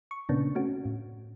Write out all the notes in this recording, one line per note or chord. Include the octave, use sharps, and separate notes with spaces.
C#6
A#2 C#3 A#3 B3 C#4 D4
A3 C4 C#4 F#4
A2